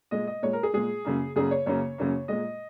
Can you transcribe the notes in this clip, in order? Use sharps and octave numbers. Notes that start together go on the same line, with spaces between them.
A#2 G#3 D#5
D#5
A#2 G#3 C#5
A#4
G#4
A#2 G#3 G#4
F#2 C#3 A#3
F#2 C#3 A#3 G#4
C#5
F#2 C#3 A#3 C#5
F#2 C#3 A#3
A#2 G#3 D#5